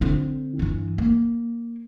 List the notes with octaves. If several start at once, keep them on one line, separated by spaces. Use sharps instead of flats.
D3 C4
G2 E3
A#3